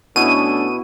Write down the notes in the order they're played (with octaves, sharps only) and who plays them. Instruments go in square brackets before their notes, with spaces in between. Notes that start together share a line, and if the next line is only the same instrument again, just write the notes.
[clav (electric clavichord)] B2 [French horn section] A3 C#4 D4 [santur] B3 E4 F#4 [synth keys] D#7